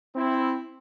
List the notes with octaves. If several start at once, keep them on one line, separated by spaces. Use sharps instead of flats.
C4 E4